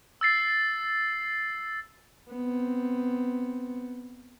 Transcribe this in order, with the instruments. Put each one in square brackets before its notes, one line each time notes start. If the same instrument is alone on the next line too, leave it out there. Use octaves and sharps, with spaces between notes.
[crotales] E6 A6 C7
[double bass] B3 C4